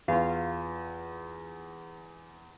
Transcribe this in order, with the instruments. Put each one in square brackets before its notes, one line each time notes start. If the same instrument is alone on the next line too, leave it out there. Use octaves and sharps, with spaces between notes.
[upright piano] E2 [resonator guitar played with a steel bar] F4 F5